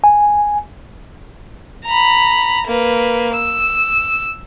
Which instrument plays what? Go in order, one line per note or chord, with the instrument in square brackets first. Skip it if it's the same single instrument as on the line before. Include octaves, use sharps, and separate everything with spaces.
[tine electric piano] G#5
[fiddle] A#5 B5
A#3 B4
E6